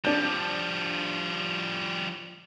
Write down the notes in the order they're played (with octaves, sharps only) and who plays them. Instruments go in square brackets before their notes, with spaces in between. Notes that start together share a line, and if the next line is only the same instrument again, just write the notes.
[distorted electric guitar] F3 G3 [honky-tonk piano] D4 G6